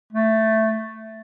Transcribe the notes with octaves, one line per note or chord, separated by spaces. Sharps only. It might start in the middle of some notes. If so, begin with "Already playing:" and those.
A3